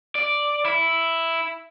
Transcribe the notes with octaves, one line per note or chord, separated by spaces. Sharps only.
D5
E4